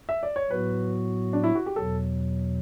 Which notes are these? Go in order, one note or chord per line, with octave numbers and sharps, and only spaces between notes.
E5
D5
C#5
A2 F#3 B3 F#4 B4
D4
E4
F#4
G4
E2 B2 F#3 A4